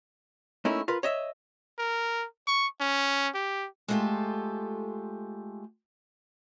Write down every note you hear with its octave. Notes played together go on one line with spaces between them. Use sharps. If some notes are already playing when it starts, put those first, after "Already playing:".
A3 A#3 C#4 D#4 E4
F4 A#4 B4
C#5 D#5 E5
A#4
C#6
C#4
G4
G#3 A3 B3 F4 G4 A4